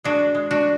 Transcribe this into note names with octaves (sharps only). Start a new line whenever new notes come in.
G#3 D4 F#4
G#3
D4 F#4